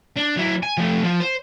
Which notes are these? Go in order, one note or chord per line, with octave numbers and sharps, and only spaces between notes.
D4
F#3 E4
G#5
F3 A3
F3 F4
C5